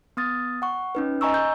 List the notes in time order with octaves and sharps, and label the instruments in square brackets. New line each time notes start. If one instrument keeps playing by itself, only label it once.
[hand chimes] B3 D#6 A6
F#5 C#6
C#4 D#4 B4
D#5 G#5 A#5 C#6 E6
G6